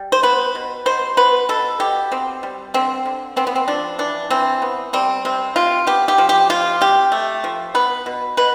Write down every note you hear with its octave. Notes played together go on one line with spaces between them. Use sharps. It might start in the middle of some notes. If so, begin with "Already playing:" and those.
Already playing: G3
C5
B3 B4
B2
B2 C5
B3 B4
B2 A4
B2 G4
B3 C4
G3
D3 C4
D3
B3 C4
B3
C4
F3 D4
E3 D4
E3 C4
B3
G3 C4
C3 C4
C3 F4
B3 G4
G4
F3
G4
C3 F4
C3 G4
A3
F3
B3 B4
B2
B2 B4